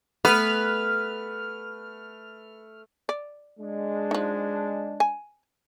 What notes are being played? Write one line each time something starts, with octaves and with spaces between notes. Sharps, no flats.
A3 B3 B4 F6
D5
G#3 D4
F3 D#4
G#5